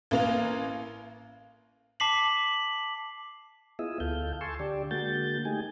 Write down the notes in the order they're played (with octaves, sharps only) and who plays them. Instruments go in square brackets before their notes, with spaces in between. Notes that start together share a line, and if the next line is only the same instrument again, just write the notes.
[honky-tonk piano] A1 A#3 F7
[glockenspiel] A5 D6 B6 C7 F#7
[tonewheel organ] B3 E4 F4 G#4 D#5 E5
D2 A4 F5 G6
G#5 A5 C6 C#6 E6
D3 G4 D5
D3 G#3 A#3 F#4 G6 A6
A3 D#4 G4 G#5